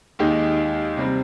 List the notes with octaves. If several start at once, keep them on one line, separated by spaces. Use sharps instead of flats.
D#2 D#3 G#3 D#4 G4
C3 G3 C4